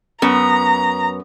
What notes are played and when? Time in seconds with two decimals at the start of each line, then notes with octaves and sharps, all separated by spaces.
0.22 F#2 B3 A#5